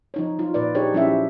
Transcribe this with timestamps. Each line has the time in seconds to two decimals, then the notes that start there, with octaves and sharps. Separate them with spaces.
0.14 F3 D#4 C#5
0.39 F#3 D#4 F4
0.54 A#2 B4 D5
0.75 D4 D#4 G4 G#4 C5 C#5
0.93 F3 F#3 C#4 E4 G4 E5